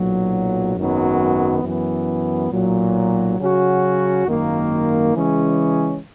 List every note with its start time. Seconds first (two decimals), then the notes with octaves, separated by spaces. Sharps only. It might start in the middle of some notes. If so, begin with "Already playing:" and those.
Already playing: B1 A#2 F#3
0.76 G#1 F#2 D#3 F#3 B3
1.63 F#2 E3 B3
2.51 B1 A#2 F#3
3.38 C#3 F#3 C#4 F#4
4.26 G#1 F#2 D#3 A#3
5.13 C#3 E3 G#3 C#4 G#4